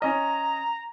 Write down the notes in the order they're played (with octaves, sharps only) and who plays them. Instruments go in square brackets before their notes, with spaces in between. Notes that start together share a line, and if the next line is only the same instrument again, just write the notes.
[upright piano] C#4 D#5 [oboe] A#5